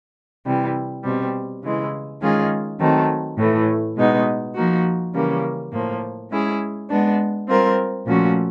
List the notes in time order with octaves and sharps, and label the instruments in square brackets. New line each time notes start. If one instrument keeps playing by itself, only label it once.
[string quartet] C3 E3 G3
B2 G3 C4
C#3 E3 G#3
D#3 G#3 C#4 F4 G#4
D#3 F#3 A3 C4
A2 E3 A3
B2 G#3 B3 D#4
F3 A#3 D#4 F#4
C#3 E3 G3 A#3 C#4
A2 F3 A#3
G#3 C#4 E4 G#4
G#3 B3 D4
G3 C4 F4 A#4
A#2 F3 A3 C#4 F#4